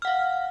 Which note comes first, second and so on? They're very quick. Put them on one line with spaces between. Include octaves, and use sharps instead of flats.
F6 F#5 F5